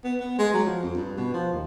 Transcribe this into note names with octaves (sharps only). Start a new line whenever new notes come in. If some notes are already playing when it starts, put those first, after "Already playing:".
B3
B3
G#3
F#3
F3
F2
G2
B2
F3
D#2